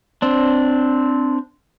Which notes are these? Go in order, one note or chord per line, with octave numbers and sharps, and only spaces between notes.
C4 D4